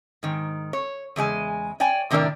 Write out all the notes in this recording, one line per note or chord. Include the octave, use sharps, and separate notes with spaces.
G#2 D#3
C#5
E2 C#3 G#3 G#5
C#5 D5 G5 G#5
A2 C3 D#3 D4 A#4 D5